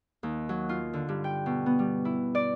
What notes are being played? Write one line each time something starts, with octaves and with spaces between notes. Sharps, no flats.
D#2
F#3
F4
D3
G2
G5
B2
B3
G3
E4
D5